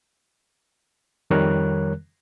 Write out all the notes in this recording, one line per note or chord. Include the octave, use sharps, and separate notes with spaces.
F2 D#3 G3 A#4 C#5 F#6